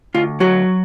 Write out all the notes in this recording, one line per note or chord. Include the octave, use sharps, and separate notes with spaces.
D2 F4
F#3 F#4